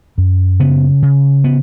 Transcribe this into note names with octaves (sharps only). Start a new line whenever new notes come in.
F#2
C#3 B3
C#3
B3